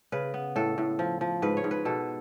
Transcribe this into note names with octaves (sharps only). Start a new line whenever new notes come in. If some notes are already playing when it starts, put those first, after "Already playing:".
C#3 B4
B3
A2 A4
A2
F3
F3
G#2 B4
C#5
G#2
B4
B2 A4